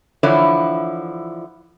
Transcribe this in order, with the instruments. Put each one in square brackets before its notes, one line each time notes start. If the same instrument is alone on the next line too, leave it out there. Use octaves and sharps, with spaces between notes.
[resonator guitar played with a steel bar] D3 E3 F3 E4 C#5